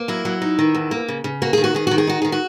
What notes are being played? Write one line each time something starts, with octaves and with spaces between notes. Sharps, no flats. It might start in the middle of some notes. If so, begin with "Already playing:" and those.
Already playing: A#3
F#3 E4
F#3
D#4
D#3
E2
A#3
C#3
C#3
A#3 F#4
D#3 G#4
F#4
D#3 G#4
D#3 F#4
G#4
D#4 F#4
D#3 G#4
F#4